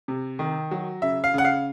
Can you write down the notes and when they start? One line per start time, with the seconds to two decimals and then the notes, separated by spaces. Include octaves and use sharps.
0.08 C3
0.39 D#3
0.71 F#3
1.02 C#3 E5
1.24 F5
1.34 C#3 F#5
1.45 F5